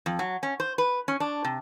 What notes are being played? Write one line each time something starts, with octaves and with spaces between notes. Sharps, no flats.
F2
F#3
C#4
C5
B4
C#4
D4
C3